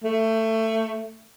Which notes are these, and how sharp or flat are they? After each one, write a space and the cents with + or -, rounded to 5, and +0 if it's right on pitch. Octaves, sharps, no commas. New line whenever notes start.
A3 +20